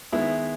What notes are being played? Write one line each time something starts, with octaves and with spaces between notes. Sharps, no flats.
D#3 G#3 B3 E4 E5